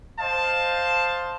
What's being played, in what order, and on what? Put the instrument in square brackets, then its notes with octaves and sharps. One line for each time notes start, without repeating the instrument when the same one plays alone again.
[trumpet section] C5 D#5 F5 A5